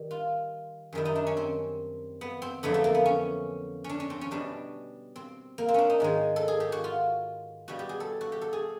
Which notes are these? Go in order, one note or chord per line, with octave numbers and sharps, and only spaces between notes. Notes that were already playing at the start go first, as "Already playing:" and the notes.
Already playing: D#3 G3
F4
F#2 D#3 G3 E4
D#4
D4
C#4
C4
B3
C4
F2 D3 F#3 A3 B3
A3
A#3
B3
C#4
C#4
D4
C#4
C4
C#4
B2 G3 D4
C4
A#3
C4
C#4 D4
D#4
G#2 D#3 G#3
A4
G#4
G4
F#4
F4
B2 G3 F#4
G4
G#4
A4
F#4
G4
A4
G#4